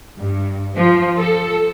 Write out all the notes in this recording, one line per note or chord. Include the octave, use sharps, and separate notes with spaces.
G2
F3
A4